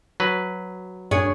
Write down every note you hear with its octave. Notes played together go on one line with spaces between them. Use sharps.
F#3 B4
F#2 D4 G#4 C#5